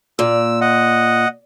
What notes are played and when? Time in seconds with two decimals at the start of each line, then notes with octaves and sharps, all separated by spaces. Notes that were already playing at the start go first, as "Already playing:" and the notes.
0.19 A#2 E6
0.61 D#5 F#5